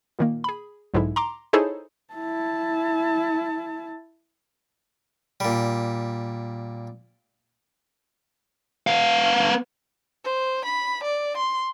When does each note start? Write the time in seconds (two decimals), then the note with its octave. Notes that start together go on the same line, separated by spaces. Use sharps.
0.19 A#2 D#3 A#3
0.44 G#4 B5
0.94 B1 G#2 D3 E4
1.16 A#5 C6 D6
1.53 D#4 E4 G#4 A4 C5 C#5
2.14 E4 A5
5.40 A#2 G3
8.87 B3 F5
10.24 C5
10.65 B5
11.03 D5
11.37 C6